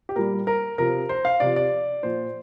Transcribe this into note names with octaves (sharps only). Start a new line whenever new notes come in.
G4
A#2 G3 A#4
A#4
C3 F3 A#4
C5
F5
C3 F3 D5
D5
A#2 F3 C5